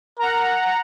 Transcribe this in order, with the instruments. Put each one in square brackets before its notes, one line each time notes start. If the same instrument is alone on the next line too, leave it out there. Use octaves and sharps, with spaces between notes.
[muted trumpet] A#4 [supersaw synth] F#5 A#5